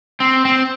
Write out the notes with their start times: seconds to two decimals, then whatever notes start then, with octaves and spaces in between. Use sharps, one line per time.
0.20 C4
0.45 C4